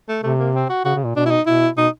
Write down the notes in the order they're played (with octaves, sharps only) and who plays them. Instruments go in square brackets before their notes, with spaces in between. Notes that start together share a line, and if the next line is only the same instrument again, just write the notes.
[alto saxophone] A3
[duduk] C3 [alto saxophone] A3
[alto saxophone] A#3
C4
F#4
[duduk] C#3 [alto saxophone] F#4
[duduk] C#3
A#2
[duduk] B2 [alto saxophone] D4
[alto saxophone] E4
D#4
[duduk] B2 [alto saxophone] E4
[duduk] B2 [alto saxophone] D#4